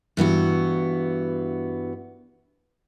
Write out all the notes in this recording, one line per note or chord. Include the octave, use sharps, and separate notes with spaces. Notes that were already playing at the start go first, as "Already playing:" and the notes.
G2 E3 B3 F#4